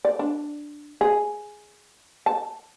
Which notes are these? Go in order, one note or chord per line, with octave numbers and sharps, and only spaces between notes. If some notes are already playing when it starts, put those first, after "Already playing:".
D5
D4
G#4
A5